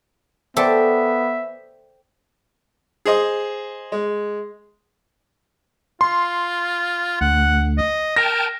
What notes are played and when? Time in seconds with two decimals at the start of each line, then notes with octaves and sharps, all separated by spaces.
0.57 B3 A4 C5 D5 E5 G5
3.05 G#4 C5 D#5
3.92 G#3
6.01 F4 C6
7.21 D2 F#5
7.78 D#5
8.16 A#4 G5 A5 A#6